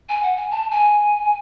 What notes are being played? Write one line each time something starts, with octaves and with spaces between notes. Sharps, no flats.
G#5
F#5
G#5
A5
G#5